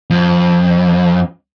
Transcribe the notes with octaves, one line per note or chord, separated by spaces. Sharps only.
F2